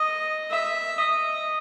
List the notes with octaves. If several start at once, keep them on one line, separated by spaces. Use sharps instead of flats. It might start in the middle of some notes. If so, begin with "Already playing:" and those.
Already playing: D#5
E5
D#5